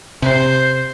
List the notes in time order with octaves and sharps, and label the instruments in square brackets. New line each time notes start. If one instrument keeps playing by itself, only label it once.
[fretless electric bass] C3 [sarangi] C5